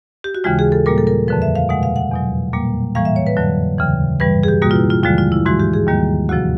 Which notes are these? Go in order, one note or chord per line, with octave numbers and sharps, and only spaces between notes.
G4
F#4
D#2 C#3 E3 G#3 F4
G#4
A4
A#2 G3 A#3 A#4
A4
A#4
F2 D3 F3 B4
E5
F5
B2 G#3 F#5
F5
F#5
E2 B2 F#3
A#2 G3 A#3
A2 E3 G3 A#3 F5
E5
C#5
B4
F2 D3 F#3
D#2 C#3 E3
G2 E3 G3 B4
G#4
G4
B2 G3 A#3 F#4
F4
E4
F4
D#2 D3 F3 G#3 F4
F4
E4
G#2 E3 G#3 F#4
G4
G#4
D#2 D#3 G3 A#3
D2 C3 F3 F#4